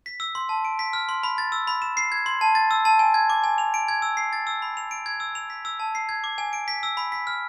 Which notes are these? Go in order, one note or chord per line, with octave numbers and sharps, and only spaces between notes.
B6
E6
C6
A5
D7
B6
F6
C6
B5
A6
E6
B5
E7
C7
G#6
C6
A5
A6
E6
A5
G#5
G#6
D6
G#5
F7
D7
G#6
E6
C7
A6
E6
B5
F7
D7
G#6
E6
F7
B6
E6
A5
C7
G#6
D6
G#5
D7
B6
E6
B5
B6
F6